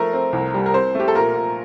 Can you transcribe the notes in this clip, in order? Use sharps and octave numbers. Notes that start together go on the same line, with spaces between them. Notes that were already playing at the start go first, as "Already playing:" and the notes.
Already playing: F3 A3 A#4
C4
C2
G3
A#4
C4 C5
A3 G4
A4
A#2 A#4
A#2